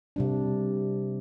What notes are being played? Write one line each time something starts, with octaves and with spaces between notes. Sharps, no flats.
C3 G3 D4